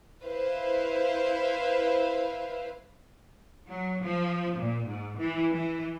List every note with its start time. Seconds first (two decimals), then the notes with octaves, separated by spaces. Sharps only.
0.23 E4 B4 C5 F5
3.66 F#3
4.02 F3
4.57 A#2
4.86 G#2
5.18 E3
5.52 E3